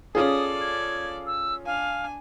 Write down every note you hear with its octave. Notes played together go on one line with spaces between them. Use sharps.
C#4 F4 G#4 A4 D5 D#6
G#6
E6
D4 F5 G#5